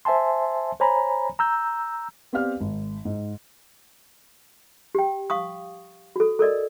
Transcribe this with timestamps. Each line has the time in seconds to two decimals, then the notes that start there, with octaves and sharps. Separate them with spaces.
0.05 C5 E5 G#5 A5 C6
0.80 C5 C#5 G#5 A#5 B5
1.39 A#5 E6 G6
2.33 B3 C4 G4 D5 F5 F6
2.61 G#1
3.05 G#2
4.95 G4 G5
5.30 F5 C#6 D#6
6.16 F#4 A4
6.39 A4 A#4 D5 D#5